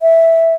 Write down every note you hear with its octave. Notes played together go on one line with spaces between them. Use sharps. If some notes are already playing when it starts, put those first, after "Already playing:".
E5